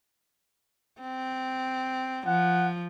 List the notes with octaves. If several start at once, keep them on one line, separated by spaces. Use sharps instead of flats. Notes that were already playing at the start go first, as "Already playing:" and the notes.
C4
F3 F#5